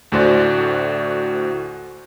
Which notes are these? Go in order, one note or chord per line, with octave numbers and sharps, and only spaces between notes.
D2 A2 F#4 C5 D5